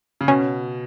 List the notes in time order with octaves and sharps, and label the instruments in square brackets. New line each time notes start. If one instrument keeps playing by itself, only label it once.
[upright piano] C#3
[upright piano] B2 [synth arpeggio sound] C#4